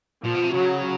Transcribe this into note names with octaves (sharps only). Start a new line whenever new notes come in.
A#2 F3
B2
C3
C#3 F#3